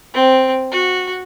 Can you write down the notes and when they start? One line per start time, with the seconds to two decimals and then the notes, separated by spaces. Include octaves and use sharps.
0.14 C4
0.71 F#4